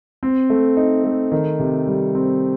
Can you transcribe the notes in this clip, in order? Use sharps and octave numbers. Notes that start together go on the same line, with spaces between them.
C4
A3
D#4
A3
D#3
C3
G3
C4